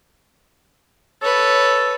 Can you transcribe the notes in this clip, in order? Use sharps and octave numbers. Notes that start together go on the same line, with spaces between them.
A4 B4 C#5